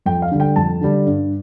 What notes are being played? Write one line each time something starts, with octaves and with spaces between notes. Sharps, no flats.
F2 G5
F5
D3 G3
G5
F2 A5
D3 G3
G2